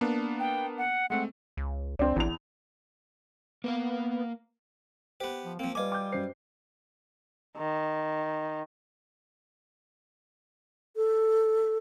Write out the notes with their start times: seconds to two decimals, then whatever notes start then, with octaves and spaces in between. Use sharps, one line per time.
0.01 A#3 B3 D4
0.40 G5
0.78 F#5
1.10 G#3 A3 C4 F#5
1.57 C#2
1.99 C#2 C4 D4
2.16 A1 E2 F7
3.64 A#3 B3 A#4 F5
5.20 B3 G4 C5
5.45 F3
5.59 F3 A#3 C4
5.75 G3 F4 B4 D#5 G#5 D6
5.92 G5 D6 G6
6.12 F#2 C5 C7
7.57 D#3
10.96 A4